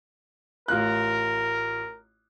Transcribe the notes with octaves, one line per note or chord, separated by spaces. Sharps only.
A1 F4 A#4 F#6